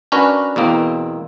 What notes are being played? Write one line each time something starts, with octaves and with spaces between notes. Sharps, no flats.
C#4 D4 F#4 A#4 B4 C#5
E2 B2 A#3 C4